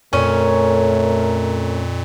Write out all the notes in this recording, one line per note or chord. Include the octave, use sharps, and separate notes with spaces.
F2 A#2 A3 C#4 A#4